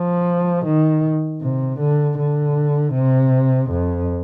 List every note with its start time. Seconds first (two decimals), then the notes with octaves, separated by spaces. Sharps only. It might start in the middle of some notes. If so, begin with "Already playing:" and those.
Already playing: F3
0.65 D#3
1.42 C3
1.80 D3
2.19 D3
2.94 C3
3.71 F2